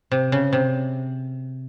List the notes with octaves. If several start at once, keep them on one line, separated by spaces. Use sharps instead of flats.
C3
C#3
C3